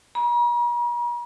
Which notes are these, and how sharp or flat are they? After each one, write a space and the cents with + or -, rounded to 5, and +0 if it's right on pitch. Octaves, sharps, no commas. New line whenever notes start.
A#5 +45